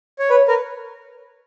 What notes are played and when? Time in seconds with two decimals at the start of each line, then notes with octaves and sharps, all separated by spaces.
0.19 C#5
0.30 B4 C#5
0.48 A#4 B4